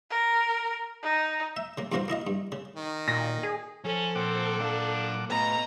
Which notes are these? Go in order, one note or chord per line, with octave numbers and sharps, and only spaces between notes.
A#4
D#4
E5
C#3 A#3
E2 G2 A#3 F#4 C5 F5
A#3 E4 D#5 F5
G2
C#3
D#3
A#2 A#6
G#4
F3 C#4 A4
A#2 C4 F#5 D6
F#3 D4 F5
A2 C#3 B3 B4 D#5 A#5